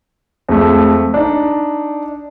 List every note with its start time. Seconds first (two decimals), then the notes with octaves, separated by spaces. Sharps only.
0.49 F2 G#3 A3
1.14 D4 D#4